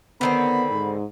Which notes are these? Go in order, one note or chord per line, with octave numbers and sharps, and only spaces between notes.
D3 D#3 B3 C4 B5
G#2